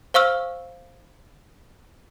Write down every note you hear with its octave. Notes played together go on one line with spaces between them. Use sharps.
C5 F5 C#6 E6 F6